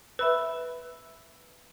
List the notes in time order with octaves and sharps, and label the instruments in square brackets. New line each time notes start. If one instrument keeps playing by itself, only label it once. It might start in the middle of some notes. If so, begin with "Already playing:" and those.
[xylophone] B4 [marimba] E5 B5 E6